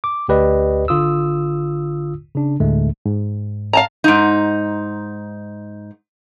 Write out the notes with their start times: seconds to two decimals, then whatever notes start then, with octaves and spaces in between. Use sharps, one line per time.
0.04 D6
0.29 D2 G4 B4 D5 D#5
0.88 G#1 D3 F4 D#6 E6
2.35 C#3 D4
2.60 D2 A2 D3 G#3 A3
3.06 G#2
3.73 F5 A5 A#5
4.04 G#2 D#4